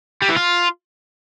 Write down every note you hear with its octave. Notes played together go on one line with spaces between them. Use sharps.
G3
E3
F4